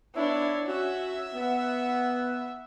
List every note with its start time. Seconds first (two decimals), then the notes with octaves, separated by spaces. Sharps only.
0.15 B3 D4 E4 C#5
0.67 C#4 F#4 E5
1.35 B3 F#5